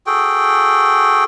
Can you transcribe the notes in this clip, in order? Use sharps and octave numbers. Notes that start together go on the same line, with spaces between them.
F#4 G#4 A4 G5